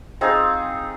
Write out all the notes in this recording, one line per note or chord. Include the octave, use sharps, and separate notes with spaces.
C4 D#4 F4 G#4